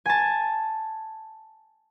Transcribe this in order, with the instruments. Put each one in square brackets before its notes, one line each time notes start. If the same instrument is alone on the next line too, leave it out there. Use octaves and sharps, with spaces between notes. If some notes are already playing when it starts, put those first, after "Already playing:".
[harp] G#5 A5